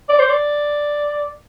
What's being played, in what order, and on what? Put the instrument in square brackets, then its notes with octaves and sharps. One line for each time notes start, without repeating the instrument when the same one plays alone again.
[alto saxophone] D5
C5
D5